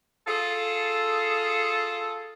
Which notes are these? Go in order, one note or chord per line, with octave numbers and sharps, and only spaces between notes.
F4 G#4 A4